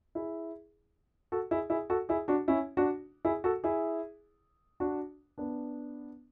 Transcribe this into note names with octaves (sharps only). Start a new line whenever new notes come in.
E4 G#4
F#4 A4
E4 G#4
E4 G#4
F#4 A4
E4 G#4
D4 F#4
C#4 E4
D4 F#4
E4 G#4
F#4 A4
E4 G#4
D4 F#4
B3 D4